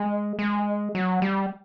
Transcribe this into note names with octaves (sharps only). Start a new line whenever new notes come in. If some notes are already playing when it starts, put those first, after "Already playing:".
Already playing: G#3
G#3
F#3
G3